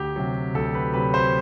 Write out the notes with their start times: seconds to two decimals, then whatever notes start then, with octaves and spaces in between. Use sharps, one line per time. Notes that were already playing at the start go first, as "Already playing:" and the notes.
Already playing: D2 G4
0.16 C3 F#3
0.54 D2 A4
0.74 B4
0.94 C3 F#3 B4
1.14 C5